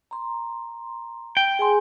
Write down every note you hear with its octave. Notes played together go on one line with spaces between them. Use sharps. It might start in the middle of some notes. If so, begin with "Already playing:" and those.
A#5 C6
G5
G#4 G#5 C6